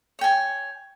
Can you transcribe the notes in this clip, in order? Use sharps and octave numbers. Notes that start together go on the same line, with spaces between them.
C#5 G5 G#5